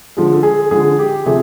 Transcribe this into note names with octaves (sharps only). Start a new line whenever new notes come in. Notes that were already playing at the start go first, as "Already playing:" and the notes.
D3 F3 G#3
A4
G#4
D3 F3 G#3 G#4
G4
C3 F3 A3 G#4